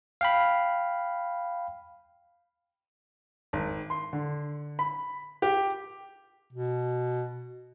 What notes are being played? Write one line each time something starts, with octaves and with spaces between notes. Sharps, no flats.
F5 G5 B5
G#1
C6
D3
B5
G4
B2